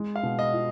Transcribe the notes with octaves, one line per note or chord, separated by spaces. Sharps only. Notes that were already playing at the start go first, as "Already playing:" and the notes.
Already playing: G#3
F5
B2
D#5
F4